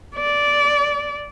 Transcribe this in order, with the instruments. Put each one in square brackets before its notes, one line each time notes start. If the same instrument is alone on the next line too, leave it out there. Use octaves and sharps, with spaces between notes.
[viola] D5